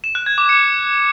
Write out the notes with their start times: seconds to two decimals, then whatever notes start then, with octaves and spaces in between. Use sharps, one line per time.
0.04 E7
0.15 F#6
0.26 G#6
0.38 D6
0.49 C#7